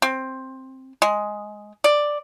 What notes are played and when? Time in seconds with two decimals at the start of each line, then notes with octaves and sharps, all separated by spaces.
0.02 C4
1.02 G#3
1.84 D5